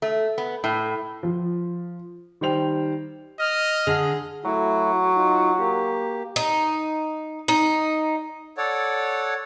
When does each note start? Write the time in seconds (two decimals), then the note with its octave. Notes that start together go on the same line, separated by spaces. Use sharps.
0.02 A3
0.38 B3
0.64 A2
1.23 F3
2.41 D#3 G3 C5 G5 F7
3.39 D#5 F6
3.87 D3 G#4
4.45 F#3 A3 E4 F#4
5.16 D#4 F4
5.58 A#3 G4
6.36 D#4
7.48 D#4
8.58 A4 C#5 D5 F#5